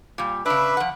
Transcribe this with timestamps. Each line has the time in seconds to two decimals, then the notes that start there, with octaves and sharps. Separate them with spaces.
0.18 A#2 G3
0.46 C#3 D4 B4 E5
0.77 F3 F#5